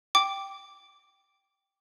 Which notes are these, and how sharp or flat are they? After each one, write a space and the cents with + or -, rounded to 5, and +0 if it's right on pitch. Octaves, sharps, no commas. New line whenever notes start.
G5 +0 D6 +0